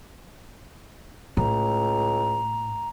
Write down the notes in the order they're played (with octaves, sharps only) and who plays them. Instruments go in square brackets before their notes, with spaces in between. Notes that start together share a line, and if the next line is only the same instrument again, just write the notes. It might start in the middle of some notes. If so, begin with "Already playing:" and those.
[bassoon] C#2 [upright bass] A2 [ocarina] A#5